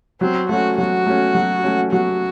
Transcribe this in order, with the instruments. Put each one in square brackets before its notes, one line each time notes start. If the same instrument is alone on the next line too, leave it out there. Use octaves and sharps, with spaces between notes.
[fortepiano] F#3 [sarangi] C4
[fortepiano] A3 C#4 [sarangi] F#4
[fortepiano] F#3 [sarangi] F#4
[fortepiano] A3 C#4
F#3
A3 C#4
[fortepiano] F#3 [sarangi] F#4